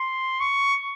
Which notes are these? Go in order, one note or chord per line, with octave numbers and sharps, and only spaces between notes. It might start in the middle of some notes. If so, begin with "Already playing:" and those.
Already playing: C6
C#6